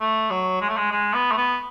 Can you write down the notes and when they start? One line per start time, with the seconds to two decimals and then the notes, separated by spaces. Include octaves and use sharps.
0.01 A3
0.30 F#3
0.61 G#3
0.69 A3
0.77 G#3
0.91 G#3
1.14 B3
1.31 A3
1.37 B3